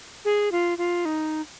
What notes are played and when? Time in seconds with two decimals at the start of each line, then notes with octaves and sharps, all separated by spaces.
0.25 G#4
0.52 F4
0.78 F4
1.05 D#4